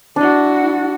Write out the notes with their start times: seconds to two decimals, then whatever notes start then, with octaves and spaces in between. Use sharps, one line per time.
0.16 D4 E4 F#4